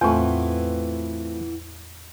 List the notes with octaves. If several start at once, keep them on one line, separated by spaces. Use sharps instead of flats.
E2 A2 E3 A3 B3 C4 F4